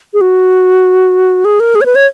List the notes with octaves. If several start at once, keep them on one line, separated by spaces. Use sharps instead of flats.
G#4
F#4
G#4
A#4
G#4
C#5
B4
C#5